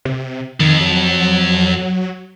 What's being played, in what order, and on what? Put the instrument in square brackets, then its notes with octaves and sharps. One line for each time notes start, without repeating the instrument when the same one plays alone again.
[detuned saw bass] C3
[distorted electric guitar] F2 [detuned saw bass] D#3
[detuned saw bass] F#3